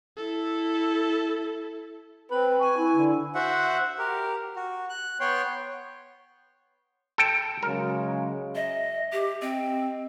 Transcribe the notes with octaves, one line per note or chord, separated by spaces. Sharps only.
E4 A4
C4 B4
G#5 C#6
E4
D3
F#4 C5 E5 F#5
G4 A#4
F#4
F#6
B3 C#5 G5 C6
A4 G5 A5
C#3 F#3 G#3 A#4
D#5 E5
G4
C4 D#5